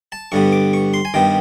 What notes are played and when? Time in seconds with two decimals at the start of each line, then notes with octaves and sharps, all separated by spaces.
0.12 A5
0.32 G2 D3 G3 B3 C#6
0.52 D6
0.73 C#6
0.94 C6
1.05 G#5
1.14 G2 D#3 G3 B3 G5